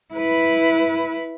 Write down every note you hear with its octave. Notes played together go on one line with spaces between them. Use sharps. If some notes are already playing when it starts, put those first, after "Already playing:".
E4 B4